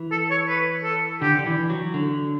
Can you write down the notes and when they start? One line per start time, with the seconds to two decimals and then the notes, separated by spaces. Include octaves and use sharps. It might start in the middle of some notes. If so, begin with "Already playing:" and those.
Already playing: E3
0.12 A4
0.31 C#5
0.48 B4
0.84 A4
1.22 D3 G4
1.39 D3
1.46 E3
1.70 F#3
1.94 D3